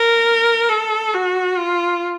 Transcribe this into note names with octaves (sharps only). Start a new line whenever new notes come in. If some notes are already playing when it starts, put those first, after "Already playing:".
Already playing: A#4
A4
F#4
F4